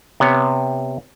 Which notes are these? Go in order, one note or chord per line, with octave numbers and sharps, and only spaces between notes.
C3 B3 C#5